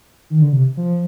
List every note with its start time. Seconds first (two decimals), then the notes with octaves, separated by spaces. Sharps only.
0.30 D#3
0.42 D3
0.53 C3
0.77 F3